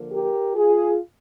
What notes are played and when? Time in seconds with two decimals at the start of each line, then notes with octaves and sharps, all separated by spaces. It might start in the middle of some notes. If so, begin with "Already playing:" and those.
Already playing: D3 F3 A#3
0.12 G4 A#4
0.55 F4 G#4